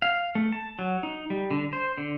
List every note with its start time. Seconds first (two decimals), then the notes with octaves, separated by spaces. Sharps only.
0.02 F5
0.35 A3
0.53 A5
0.79 F#3
1.03 D#4
1.30 G3
1.51 D3
1.73 C5
1.98 D3